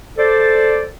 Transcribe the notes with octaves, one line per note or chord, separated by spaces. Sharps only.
A4 C5 D5